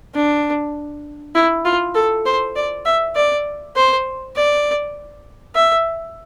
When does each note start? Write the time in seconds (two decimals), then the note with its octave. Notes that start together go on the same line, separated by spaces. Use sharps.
0.15 D4
1.35 E4
1.65 F4
1.95 A4
2.26 C5
2.56 D5
2.86 E5
3.16 D5
3.76 C5
4.36 D5
5.55 E5